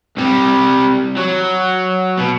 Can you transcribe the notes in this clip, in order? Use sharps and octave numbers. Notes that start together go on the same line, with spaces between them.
C2 G3
F#3
B2